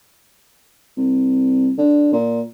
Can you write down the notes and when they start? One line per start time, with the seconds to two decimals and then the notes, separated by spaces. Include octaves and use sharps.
0.97 C2
1.78 D3
2.13 A#2